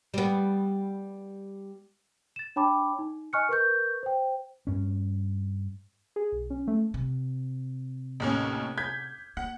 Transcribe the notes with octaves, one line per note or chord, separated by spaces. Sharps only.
G3 B3
A6 E7
D4 C#5 G5 A5 B5 D6
D#4
D#5 G#5 C#6 F6 F#6 C#7
A#4 B4 C#6 G6
C5 G5
G2 C#4
G#4
B1
C#4
A3
C3
A1 D#2 C#4
G6 G#6 B6
A#3 F#5